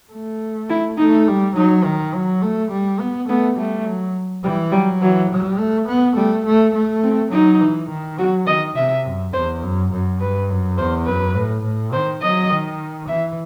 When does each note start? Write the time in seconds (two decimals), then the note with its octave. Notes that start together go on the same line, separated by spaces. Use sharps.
0.13 A3
0.70 E4
0.98 A3 D#4
1.28 G3
1.56 F#3 D#4
1.85 D#3
2.14 F#3
2.42 A3
2.71 G3
3.00 B3
3.29 A3 B3
3.57 G3 A3
3.86 F#3
4.44 E3 G3
4.72 F#3 G3
5.01 E3 F#3
5.31 G3
5.59 A3
5.88 B3
6.16 G3 A3
6.46 A3
6.75 A3
7.03 C4
7.32 F#3 D#4
7.61 E3
7.90 D#3
8.19 F#3 F#4
8.47 D#3 D#5
8.75 C3 E5
9.04 F#2
9.34 E2 C5
9.62 F#2
9.92 F#2
10.21 G2 B4
10.50 F#2
10.78 E2 C5
11.06 F#2 B4
11.35 A2
11.64 A2
11.93 D#3 C5
12.22 F#3 D#5
12.50 D#3
13.08 E3 E5